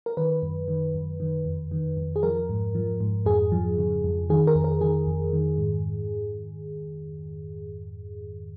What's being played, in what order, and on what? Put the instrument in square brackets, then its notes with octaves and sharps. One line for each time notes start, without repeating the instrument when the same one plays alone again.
[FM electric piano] A#4
D#3 B4
F#2
D#3
F#2
D#3
F2
D#3
F2
G#4
F3 A#4
G#2
F3
G#2
F2 G#4
F3
C#3
F2
D#3 G#4
A#4
F2
A#4
D#3 G#4
F2
D#3
G#2